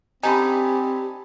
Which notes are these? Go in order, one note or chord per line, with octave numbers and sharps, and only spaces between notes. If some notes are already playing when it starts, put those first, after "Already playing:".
D3 C4 C#4 D#4 G4 G#5 A5 B5